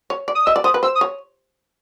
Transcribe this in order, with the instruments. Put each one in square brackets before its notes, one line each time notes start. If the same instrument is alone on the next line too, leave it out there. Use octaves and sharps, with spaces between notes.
[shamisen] C#5
D5
[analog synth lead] D#6
[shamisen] D#5 [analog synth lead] E6
[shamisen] D5
[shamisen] C5 [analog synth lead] D#6
[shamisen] B4
[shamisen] C5 [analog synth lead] E6
[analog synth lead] D#6
[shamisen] C#5